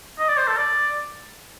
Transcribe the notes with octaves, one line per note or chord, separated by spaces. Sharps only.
D#5
D5
C5
A4
D5